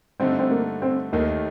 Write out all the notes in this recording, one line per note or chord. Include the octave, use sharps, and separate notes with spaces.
G2 D3 A3 C4 D#4
C4
A#3
C4
D#2 D#3 A3 A#3 D#4